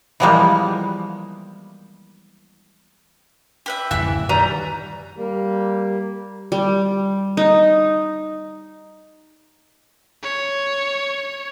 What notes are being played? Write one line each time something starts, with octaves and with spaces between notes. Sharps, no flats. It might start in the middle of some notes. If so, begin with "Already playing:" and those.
E3 F3 G3 G#3 A#3 B3
G4 B4 E5
D1 F#2 B2 E3 E5 E6 F#6
D#3 G3 B4 A#5
G3 A#3
G3
D#4
C#5